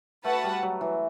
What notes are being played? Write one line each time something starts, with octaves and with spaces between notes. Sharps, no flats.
A3 F#4 B4 F#5 A5
G3
F#3
E3